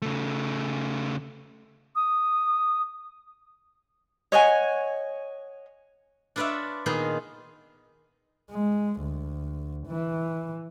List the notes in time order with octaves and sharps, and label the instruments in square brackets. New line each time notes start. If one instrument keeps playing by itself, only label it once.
[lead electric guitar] C#3 A3
[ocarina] D#6
[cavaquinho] C#5 D#5 F#5 G#5
[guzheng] D4 F4 B4 C#5 D5 E5
A#2 D#3 B3 D#4 F4 G#4
[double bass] G#3
D2
E3